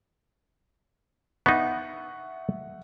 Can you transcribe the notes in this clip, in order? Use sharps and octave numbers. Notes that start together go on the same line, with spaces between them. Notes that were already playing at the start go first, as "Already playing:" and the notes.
B3 D4 D#4 E5 F#5 C#6